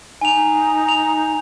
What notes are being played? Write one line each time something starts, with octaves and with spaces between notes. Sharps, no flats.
D#4 G#5 F7
F7